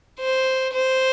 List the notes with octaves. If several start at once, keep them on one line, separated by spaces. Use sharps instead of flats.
C5
C5